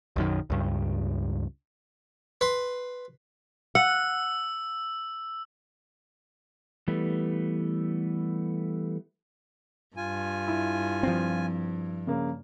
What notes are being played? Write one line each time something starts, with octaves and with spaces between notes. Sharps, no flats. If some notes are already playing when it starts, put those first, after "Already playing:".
B1 F#2 D#3
C#2 G2
B4 C6
F#5 E6
E3 G3 A3 B3
G2 F4 G#5
E4
F3 C4
C#3 A#3